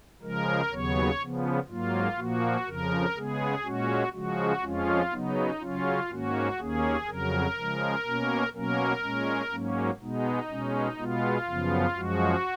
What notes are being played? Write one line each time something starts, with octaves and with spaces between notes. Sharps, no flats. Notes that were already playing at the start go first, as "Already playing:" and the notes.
C#3 F3 G#3 A#4
D#2 C#3 F#3 B3 C#5
C#3 F3 B3
G#2 F#3 A#3 F4
A#2 F3 A#3 F#4
F2 C#3 F3 A#4
C#3 G#3 B3 G#4
A#2 G#3 C#4 F#4
C#3 F3 G#3 F#4
F2 F3 G#3 C#4 F4
C#3 F#3 B3 D#4
C#3 F#3 C#4 F4
G#2 D#3 A#3 C#4 F#4
D#2 D#3 A#3 C#4 G#4
F2 C#3 F#3 A#4
C#3 F3 G#3
B2 A#3 C#4
B2 F#3 A#3 C#4 A#4
A#2 G#3 C#4
G#2 F#3 A#3 C#4
B2 G#3 B3 D#4
B2 G#3 C#4
B2 G#3 B3 F4
F#2 C#3 F3 B3
F#2 F3 G#3 F#4